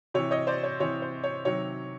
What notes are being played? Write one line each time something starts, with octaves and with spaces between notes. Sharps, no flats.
C3 E3 C#5
C#5 D#5
C5 D5
C#5
C3 E3 C#5
C5
C#5
C3 D#3 F#3 C#5